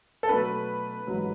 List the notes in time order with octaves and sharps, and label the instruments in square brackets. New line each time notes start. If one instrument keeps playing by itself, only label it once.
[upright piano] A4
[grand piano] B2 F#3 A3 D4 [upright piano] B4
[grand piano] A1 G#2 F#3